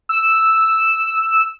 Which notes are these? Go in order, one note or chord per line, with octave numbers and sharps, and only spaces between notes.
E6